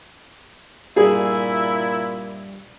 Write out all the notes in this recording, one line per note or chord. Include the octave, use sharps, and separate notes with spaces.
G2 A#2 E4 G#4 B5